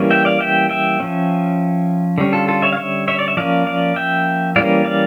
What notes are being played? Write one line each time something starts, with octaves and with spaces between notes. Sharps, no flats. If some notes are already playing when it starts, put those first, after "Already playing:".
Already playing: E3 G3 A#3 C#4
E5 G5
D5 F5
E5 G5
E5 G5
F3 C#4
D3 G3 C#4
F4 A4
F4 A4
C#5 E5
F5
C#5 E5
C#5 E5
D5
E5
F3 A#3 C#4 D5 F5
D5 F5
E5 G5
E3 G3 A#3 C#4 D5 F5
D5 F5